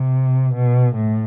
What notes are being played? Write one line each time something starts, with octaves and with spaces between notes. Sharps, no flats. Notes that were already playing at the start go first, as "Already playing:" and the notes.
Already playing: C3
B2
A2